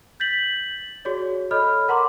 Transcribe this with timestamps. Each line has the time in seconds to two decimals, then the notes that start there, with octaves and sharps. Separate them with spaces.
0.20 G6 A6 B6 F#7
1.05 F#4 G#4 C#5 D5
1.51 A4 C#5 D#5 B5 F6
1.88 A#4 F#5 A#5 C6 D6